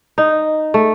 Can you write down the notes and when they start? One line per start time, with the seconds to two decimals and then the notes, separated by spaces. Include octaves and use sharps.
0.18 D#4
0.74 A3